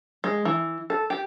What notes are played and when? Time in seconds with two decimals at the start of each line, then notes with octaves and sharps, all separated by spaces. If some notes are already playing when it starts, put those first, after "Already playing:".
0.24 G#3
0.45 E3
0.90 A4
1.10 G4